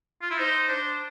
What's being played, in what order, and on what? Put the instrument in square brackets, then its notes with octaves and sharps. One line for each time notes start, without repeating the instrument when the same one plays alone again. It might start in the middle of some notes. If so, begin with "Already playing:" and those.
[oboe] F4
E4
[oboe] D#4 [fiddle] C5
[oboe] D4 [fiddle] C5